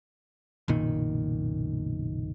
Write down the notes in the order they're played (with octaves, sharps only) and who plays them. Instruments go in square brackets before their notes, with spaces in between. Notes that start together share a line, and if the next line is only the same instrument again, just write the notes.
[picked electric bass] F#1 B1 A#2 D#3